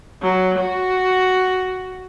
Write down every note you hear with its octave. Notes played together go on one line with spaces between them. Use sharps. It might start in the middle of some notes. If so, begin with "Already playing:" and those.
F#3
F#4